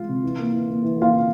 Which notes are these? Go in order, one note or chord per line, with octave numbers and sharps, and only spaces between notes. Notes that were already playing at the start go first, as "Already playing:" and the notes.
Already playing: G#3 F4
C3
E3
A#3
E3
A#3
E3
A#3
F4 F5
E3